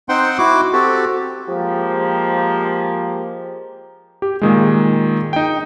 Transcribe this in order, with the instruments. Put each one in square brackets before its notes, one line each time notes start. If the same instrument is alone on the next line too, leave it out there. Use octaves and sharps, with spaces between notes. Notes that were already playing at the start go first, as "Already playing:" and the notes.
[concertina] C4 D#4 C5 F#5 G5 C6
E4 F#4 D6
C4 F#4 G4 A4
[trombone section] F3 G#3 A#3 G4
[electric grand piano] G4
A#2 D#3 G#3
D#4 G5